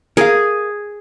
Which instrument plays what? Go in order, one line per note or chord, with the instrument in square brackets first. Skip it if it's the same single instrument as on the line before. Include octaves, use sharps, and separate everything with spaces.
[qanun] G#4 [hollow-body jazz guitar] A#4 F5